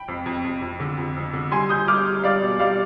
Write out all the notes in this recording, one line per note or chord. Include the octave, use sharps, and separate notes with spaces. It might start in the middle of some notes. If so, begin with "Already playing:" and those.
Already playing: G5 B5
F2
F2
F2
F2
D3
F2
F2
D3
G3 G#5 C6
G3 D#6 G6
G3 D6 F6
G3
G3 D5 F5
B2
G3 D5 F5